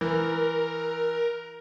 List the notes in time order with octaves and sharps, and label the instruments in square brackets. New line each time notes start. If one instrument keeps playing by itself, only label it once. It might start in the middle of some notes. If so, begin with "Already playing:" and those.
[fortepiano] E3 [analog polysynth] A#4